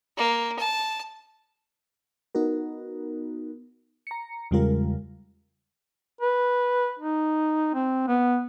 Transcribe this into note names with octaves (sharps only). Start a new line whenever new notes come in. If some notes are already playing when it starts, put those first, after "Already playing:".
A#3
A5
B3 D#4 F#4 A#4
A#5 C#7
E2 C#3 G3 G#3 F4 A#4
B4
D#4
C4
B3